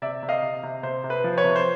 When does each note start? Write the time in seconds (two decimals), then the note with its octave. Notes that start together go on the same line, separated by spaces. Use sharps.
0.02 C3 D5 E5
0.23 C3
0.29 D#5 F5
0.42 C3
0.63 C3
0.83 C3 C5
1.04 C3
1.10 B4
1.24 F3
1.38 B4 C#5
1.44 C3
1.56 C5